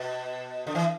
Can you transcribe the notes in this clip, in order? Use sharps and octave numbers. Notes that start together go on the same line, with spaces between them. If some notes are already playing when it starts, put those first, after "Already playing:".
Already playing: B2
D3
E3